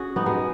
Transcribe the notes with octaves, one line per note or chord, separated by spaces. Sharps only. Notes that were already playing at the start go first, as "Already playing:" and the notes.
Already playing: C#4 F#4 G#4
B3 D#4
G#3 B3